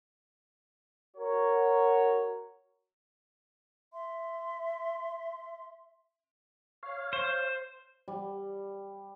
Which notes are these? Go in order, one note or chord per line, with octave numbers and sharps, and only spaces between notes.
F#4 A#4 C#5
E5 C6
C#5 F5
C5
G3